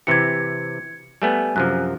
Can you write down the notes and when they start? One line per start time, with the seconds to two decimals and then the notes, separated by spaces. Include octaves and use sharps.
0.07 C3 E3 G4 G#6 C#7
1.22 G3 A3 B3 G#5
1.56 F#2 C3 F3 F#6